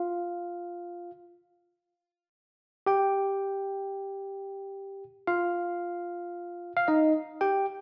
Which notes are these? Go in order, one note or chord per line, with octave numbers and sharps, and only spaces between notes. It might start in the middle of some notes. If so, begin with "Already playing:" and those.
Already playing: F4 F5
G4 G5
F4 F5
F5
D#4 D#5
G4 G5